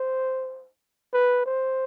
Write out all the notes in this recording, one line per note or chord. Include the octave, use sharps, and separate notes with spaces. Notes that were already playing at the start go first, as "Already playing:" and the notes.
Already playing: C5
B4
C5